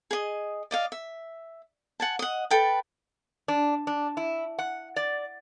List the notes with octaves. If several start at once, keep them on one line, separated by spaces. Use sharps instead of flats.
G#4 D#5
D5 D#5 F5
E5
F#5 G#5 A5
D#5 F#5
A4 B4 G5 A5
D4
D4
E4
F#5
D5